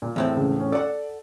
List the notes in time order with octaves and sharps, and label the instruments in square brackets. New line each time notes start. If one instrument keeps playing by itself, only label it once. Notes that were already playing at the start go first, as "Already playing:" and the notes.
[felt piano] A#2
[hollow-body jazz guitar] E2 A2 C4 [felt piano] E5
[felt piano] C#2
C#4
[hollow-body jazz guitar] A4 F#5 [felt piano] D5